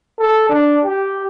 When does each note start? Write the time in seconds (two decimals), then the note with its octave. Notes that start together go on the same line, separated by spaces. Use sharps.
0.20 A4
0.49 D4
0.84 G4